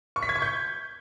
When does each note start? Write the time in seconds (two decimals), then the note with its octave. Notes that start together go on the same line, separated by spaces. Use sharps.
0.16 C#6
0.23 B6
0.29 G#6
0.36 C#6
0.42 G6